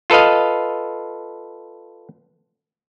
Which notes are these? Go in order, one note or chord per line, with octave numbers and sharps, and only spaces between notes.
F4 A4 B4 D#5 F5